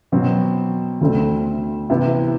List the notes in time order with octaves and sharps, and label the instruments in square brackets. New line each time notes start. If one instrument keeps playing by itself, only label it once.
[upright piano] B2 F#3 C4
D2 D3 A3 C4
C3 E3 B3 E4